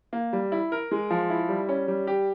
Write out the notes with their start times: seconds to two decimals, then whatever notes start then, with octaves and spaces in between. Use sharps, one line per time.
0.13 A#3
0.33 G3
0.52 E4
0.72 A#4
0.91 G#3
1.11 F3
1.30 E4
1.49 G3
1.69 C#4
1.88 G3
2.07 G4